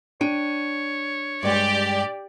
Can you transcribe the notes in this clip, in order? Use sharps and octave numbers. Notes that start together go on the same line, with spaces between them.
D4 C#5 G5 D#7
G2 G#3 G4 D5